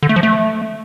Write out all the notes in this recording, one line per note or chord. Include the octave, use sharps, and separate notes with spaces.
D3
A3
F3
A3